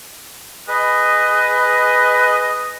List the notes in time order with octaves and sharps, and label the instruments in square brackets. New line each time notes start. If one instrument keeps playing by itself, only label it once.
[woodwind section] G#4 B4 D#5